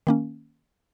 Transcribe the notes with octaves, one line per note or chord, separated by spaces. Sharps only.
D#3 A#3 C#4